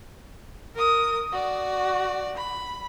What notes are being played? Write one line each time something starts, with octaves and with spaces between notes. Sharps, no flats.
A#4 D#6
F#4 D5
B5